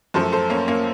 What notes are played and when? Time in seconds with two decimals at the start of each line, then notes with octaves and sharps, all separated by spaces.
0.14 F#2 F3 A3 A4 C5
0.32 A4 C5
0.50 A#3 C#4
0.68 A#3 C#4